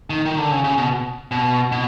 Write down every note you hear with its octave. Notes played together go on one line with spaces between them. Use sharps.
D#3
D#3
D3
C#3
C#3
B2
B2
B2